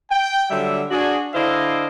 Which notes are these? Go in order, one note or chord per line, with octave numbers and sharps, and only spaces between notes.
G5
D3 F#3 G3 E5
D4 F#4 G#4
D3 D4 E4 C5 D#5 F5